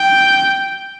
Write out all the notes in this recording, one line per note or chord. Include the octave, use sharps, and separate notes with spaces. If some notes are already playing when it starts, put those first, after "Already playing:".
Already playing: G5